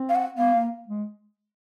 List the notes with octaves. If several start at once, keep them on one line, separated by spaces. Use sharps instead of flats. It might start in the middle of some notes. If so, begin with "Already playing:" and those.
Already playing: C4
F5
F#5
B3 F5
A#3
G#3